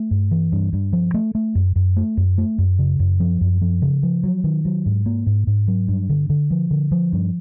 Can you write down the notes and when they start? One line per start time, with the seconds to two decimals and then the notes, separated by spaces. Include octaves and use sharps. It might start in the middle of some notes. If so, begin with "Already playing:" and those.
Already playing: A3
0.11 G2
0.31 E3
0.52 G2
0.73 G2
0.93 F3
1.14 A3
1.35 A3
1.55 F#2
1.76 F#2
1.96 A3
2.17 F#2
2.38 A3
2.58 F#2
2.79 C#3
3.00 F#2
3.20 F3
3.41 F#2
3.61 F3
3.82 C#3
4.03 F3
4.24 F#3
4.44 D#3
4.65 F#3
4.86 G#2
5.06 A#3
5.27 G#2
5.47 G#2
5.68 F#3
5.88 G2
6.09 D3
6.30 D3
6.51 F3
6.71 D3
6.92 F3
7.13 G2